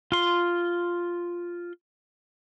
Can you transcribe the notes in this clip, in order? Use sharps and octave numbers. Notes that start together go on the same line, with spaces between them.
F4 C6